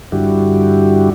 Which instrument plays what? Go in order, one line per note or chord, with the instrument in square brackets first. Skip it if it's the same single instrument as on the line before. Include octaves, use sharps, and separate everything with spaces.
[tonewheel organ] G2 D3 G3 E4 F#4 G4